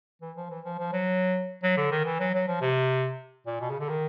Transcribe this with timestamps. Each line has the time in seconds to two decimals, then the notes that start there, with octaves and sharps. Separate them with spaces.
0.22 E3
0.37 F3
0.50 E3
0.65 F3
0.79 F3
0.93 F#3
1.63 F#3
1.77 D3
1.91 D#3
2.05 E3
2.20 F#3
2.34 F#3
2.47 F3
2.61 C3
3.46 A#2
3.61 B2
3.70 C#3
3.80 D3
3.89 D#3